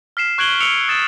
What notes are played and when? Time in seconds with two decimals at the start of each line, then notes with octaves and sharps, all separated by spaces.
0.17 F6 B6 C7 E7
0.38 C#6 F#6 G#6 D7 F#7 G7
0.60 E6 C#7 D7 F7 G7
0.88 D#6 A6 E7